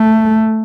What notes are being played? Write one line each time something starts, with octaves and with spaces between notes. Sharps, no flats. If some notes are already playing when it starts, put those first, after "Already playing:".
Already playing: A3